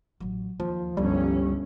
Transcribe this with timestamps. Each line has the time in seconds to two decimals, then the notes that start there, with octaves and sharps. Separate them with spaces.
0.20 A1 F#3
0.60 D#2 F3
0.97 G1 C#2 G2 G3 C#4 E4